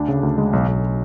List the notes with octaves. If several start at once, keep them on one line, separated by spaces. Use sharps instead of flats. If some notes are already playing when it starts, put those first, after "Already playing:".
Already playing: D2 D4
C#3
D2
G#3
B1
B1